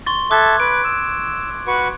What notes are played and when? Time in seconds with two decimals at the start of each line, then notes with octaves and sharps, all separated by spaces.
0.06 C6 C#6 A6
0.31 A4 E5 D6 F#6 G#6
0.60 B4 D7
0.85 E6
1.67 F#4 B4 C#6